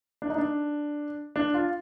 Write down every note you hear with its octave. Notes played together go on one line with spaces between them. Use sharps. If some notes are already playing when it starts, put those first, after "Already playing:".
D4
D#4
D4
D4
F4